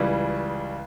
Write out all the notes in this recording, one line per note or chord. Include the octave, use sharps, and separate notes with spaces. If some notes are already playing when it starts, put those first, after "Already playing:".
Already playing: C#2 C#3 E3 G3